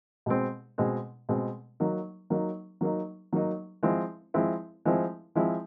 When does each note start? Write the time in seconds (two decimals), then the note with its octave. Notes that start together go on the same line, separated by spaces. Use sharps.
0.26 B2 G#3 C4
0.78 B2 G#3 C4
1.29 B2 G#3 C4
1.80 F#3 A#3 D#4
2.30 F#3 A#3 D#4
2.81 F#3 A#3 D#4
3.33 F#3 A#3 D#4
3.83 F3 G#3 C4 E4
4.34 F3 G#3 C4 E4
4.85 F3 G#3 C4 E4
5.35 F3 G#3 C4 E4